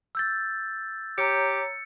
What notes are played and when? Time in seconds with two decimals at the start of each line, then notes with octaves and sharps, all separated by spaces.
0.15 E6 G6 A6
1.18 G4 C#5 A#5 C#7